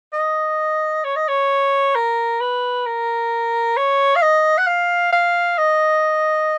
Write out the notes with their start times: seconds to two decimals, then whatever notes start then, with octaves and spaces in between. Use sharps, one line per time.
0.13 D#5
1.04 C#5
1.16 D#5
1.28 C#5
1.95 A#4
2.41 B4
2.86 A#4
3.77 C#5
4.16 F5
4.22 D#5
4.58 F#5
4.67 F5
5.12 F5
5.58 D#5